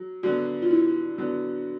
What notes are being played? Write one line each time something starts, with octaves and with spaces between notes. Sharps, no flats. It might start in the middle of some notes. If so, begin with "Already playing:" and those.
Already playing: F#3
D3 F#3 B3 F#4
F4
E4
D3 F#3 B3